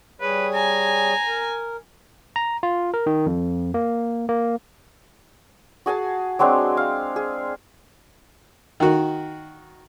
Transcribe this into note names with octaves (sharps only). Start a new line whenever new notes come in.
G3 G#4 B4 C#5
G#5 A#5
A#4
A#5
F4
A#4
D#3
F2
A#3
A#3
F#4 G#4 G#5 A5
F#3 G#3 C4 D4
F5
G#4
D#3 F#4